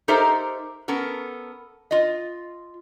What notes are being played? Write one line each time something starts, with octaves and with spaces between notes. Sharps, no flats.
D#4 G4 A4 A#4 C5 E5
B3 C#4 A4 A#4
F4 D#5